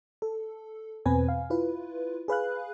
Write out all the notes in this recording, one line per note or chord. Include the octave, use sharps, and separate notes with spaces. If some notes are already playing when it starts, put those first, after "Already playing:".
A4
E2 B2 C4 B4 G#5
F5
E4 F4 B4
G#4 B4 F5 F#6